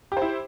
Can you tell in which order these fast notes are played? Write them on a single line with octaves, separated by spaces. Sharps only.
G4 C5 E4